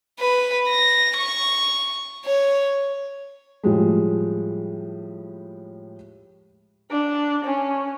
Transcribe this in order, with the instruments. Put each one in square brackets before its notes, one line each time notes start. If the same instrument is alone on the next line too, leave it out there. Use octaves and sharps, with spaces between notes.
[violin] B4
A#6
C#6
C#5
[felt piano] A2 F3 G3 G#3
[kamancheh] D4
C#4